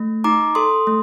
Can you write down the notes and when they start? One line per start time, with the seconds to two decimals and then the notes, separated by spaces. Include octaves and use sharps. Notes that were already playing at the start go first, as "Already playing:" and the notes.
Already playing: A3
0.24 D#4 A#5 D6
0.55 A4 C6 D#6
0.87 A3